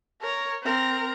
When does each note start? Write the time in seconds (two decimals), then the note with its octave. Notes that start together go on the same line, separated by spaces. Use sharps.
0.21 A#4 C#5
0.63 C4 A#4